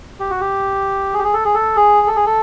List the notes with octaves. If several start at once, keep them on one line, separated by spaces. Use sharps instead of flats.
G4
F#4
G4
G#4
G4
G#4
A4
G#4
A4
G#4
A4
G#4
A4